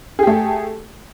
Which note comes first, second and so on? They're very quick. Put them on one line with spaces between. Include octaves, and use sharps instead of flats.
G#4 G4 A3